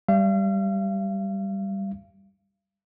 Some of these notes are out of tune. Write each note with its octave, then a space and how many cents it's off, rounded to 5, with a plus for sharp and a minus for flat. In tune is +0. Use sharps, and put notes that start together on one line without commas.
G3 +0 F5 -40